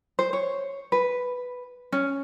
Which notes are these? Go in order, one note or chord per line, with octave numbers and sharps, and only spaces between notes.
C5
C#5
B4
C#4